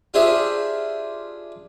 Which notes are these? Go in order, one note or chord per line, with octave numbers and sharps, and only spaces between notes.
D4 F4 G4 G#4 C5 E5